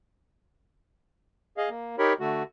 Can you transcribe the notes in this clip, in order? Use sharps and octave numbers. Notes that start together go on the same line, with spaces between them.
G#4 D#5 F5
A#3
D#4 G4 A#4 C#5 B5
D3 A3 F#4